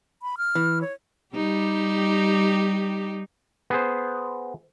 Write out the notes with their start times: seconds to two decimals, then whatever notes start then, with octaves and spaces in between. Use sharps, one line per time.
0.22 B5
0.37 F6
0.55 E3
0.81 C#5
1.35 G3 D#4 G4
3.70 B3 G#4 C5